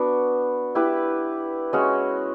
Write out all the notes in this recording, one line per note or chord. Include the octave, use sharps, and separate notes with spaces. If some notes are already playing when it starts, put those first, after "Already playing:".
Already playing: B3 D4 F#4
E4 G4 B4
G#3 C#4 F#4